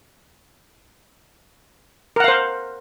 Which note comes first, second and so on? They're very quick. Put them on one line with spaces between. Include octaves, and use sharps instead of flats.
A#4 F#5 F5 C5